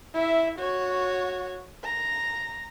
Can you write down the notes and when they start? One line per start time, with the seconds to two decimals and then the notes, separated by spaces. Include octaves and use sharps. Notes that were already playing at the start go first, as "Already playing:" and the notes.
0.15 E4 E5
0.59 F#4 C#5
1.84 A#5